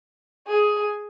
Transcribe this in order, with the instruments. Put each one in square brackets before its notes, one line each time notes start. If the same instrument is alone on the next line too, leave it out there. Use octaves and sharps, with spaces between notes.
[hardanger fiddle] G#4